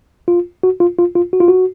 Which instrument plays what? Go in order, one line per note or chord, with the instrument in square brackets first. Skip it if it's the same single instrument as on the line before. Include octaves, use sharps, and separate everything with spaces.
[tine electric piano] F4
F#4
F4
F4
F4
F#4
F4
F#4